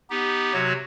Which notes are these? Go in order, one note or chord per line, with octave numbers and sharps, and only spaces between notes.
B3 D#4 G4
C3 F#3 F#4 C#5